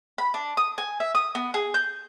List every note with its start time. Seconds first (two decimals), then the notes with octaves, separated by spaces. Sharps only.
0.18 B5
0.34 D4
0.57 D#6
0.78 G#5
1.00 E5
1.15 D#6
1.35 B3
1.54 G#4
1.74 G6